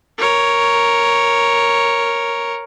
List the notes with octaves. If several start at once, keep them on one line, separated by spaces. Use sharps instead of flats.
A#4 C#5